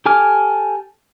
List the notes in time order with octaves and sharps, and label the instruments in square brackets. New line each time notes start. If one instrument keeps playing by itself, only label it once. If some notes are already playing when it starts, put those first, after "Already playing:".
[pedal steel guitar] G4 A4 G#5 D6 F6